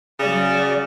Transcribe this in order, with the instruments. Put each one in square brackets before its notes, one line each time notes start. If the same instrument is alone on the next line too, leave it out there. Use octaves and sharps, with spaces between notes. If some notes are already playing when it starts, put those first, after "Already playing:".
[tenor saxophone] C#3 [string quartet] F#3 D5